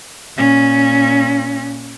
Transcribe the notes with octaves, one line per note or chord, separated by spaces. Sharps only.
A#2 C#4